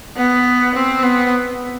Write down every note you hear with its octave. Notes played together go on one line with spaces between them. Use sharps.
B3
C4
B3